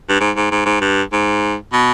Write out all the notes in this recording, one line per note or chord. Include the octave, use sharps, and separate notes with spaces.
G2
G#2
G#2
G#2
G#2
G2
G#2
B2